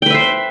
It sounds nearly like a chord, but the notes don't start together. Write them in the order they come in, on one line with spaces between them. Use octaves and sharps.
G5 B4 E5 C5